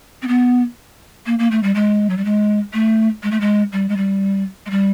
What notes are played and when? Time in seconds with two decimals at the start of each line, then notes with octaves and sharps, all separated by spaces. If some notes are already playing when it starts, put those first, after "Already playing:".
0.22 C4
0.28 B3
1.26 A#3
1.39 A#3
1.51 A3
1.63 G3
1.75 G#3
2.10 F#3
2.17 G3
2.25 G#3
2.73 A3
3.23 G#3
3.31 A3
3.41 G#3
3.72 G3
3.89 G#3
3.97 G3
4.66 G#3
4.70 G3